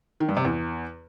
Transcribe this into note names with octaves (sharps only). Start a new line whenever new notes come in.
D#3
G2
C3
E2